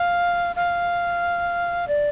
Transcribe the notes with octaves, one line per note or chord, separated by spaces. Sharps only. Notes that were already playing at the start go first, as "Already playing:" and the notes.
Already playing: F5
F5
D5